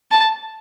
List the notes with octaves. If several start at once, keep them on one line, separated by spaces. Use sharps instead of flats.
A5